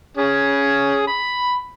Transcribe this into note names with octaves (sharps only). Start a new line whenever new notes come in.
C#4 G#4
B5